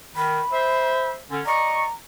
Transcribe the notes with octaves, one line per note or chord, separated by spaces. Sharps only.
D#3 B5
C5 E5
D3 C#4
D5 D#5 A#5 C#6